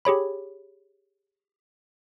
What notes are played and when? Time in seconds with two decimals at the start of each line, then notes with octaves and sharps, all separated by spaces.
0.05 G4 G#4 C#5 B5